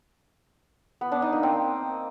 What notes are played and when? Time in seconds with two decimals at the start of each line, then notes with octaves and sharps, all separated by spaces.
1.01 B3
1.12 D4
1.22 D#4
1.33 A#3
1.43 C4